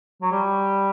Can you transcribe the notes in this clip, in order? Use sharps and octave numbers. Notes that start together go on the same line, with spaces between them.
F#3
G3